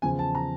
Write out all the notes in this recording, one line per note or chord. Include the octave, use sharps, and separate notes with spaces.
E2 C#3 F3 G#5
A5
A#5